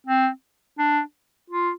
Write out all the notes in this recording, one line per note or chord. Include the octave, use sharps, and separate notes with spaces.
C4
D4
F4